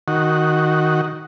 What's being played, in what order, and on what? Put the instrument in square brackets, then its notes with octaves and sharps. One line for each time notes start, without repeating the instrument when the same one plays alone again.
[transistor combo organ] D#3 F#4